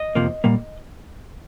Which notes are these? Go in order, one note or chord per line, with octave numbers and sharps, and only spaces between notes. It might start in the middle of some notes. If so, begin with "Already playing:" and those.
Already playing: D#5
F2 C3 F3 A#3
A#2 G3 A#3